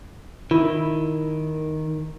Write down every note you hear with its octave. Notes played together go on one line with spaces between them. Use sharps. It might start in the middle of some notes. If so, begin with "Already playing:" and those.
D#3 E4